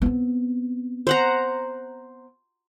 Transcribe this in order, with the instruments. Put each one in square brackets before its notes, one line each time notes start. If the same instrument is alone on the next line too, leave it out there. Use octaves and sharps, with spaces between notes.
[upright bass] B3 C4
[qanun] C5 F#5 A#5